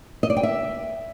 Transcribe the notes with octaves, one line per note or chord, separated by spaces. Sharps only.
D#5
D5
G5
E5